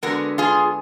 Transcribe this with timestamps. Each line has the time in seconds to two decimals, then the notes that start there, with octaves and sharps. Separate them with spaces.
0.03 D3 G#3 B3 F#4 A#4
0.38 F4 G#4